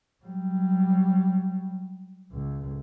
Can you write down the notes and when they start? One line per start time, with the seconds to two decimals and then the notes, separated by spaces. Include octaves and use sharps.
0.24 F#3 G3
2.32 C#2